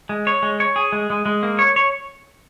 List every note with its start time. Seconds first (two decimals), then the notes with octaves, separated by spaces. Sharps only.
0.09 G#3
0.27 C#5
0.43 G#3
0.60 C#5
0.76 G#4
0.92 G#3
1.10 G#3
1.26 G#3
1.43 A#3
1.59 C#5
1.76 C#5